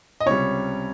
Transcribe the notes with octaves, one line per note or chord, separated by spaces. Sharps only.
D#5
C#2 C3 G3 C#5